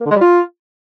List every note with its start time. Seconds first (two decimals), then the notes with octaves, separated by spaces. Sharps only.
0.01 A#3
0.06 D3
0.11 G#3
0.16 G3
0.21 F4